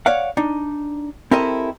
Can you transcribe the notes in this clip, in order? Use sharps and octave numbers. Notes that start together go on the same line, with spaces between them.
C#5 D5 F5 F#5
D4 D#4
C4 E4 G4 A4 A#4 D#5